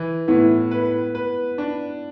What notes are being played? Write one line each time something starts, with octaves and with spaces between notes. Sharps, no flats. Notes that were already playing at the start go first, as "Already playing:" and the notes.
Already playing: E3
A2 B3 E4
B4
B4
D4